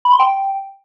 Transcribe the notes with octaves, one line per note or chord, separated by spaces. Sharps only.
B5
C6
G5